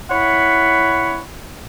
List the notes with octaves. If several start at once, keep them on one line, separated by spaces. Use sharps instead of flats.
E4 C#5 F#5 B5